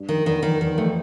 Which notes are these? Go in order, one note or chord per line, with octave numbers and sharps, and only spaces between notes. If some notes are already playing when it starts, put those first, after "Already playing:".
Already playing: G2
F2 D#3
E2 D#3
F2 D#3
E2 D#3
F2 A3